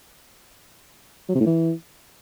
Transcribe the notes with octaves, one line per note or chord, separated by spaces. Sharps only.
F#3
C3
A2
E3